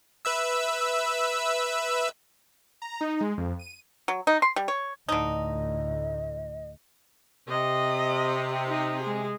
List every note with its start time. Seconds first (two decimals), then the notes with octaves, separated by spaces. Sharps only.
0.25 B4 E5 E6
2.82 A#5
3.01 D#4
3.21 G#3
3.38 F2
3.59 D#7
4.08 F#3
4.27 D#4
4.42 C6
4.56 G3
4.68 C#5
5.09 D2 A2 D3 D#4 D#5
7.48 C3 D#5
8.68 D#4
9.02 G#3 G#4